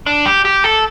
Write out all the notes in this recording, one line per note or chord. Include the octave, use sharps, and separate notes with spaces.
D4
G4
G4
A4